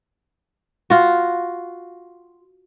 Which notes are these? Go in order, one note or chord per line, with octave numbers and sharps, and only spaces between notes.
F4 F#4